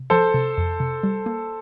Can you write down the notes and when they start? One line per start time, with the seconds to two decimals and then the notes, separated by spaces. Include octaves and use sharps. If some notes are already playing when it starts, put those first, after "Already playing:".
Already playing: C3
0.10 F3 A4 C5
0.34 C3
0.58 F2
0.80 C3
1.03 G3
1.26 A#3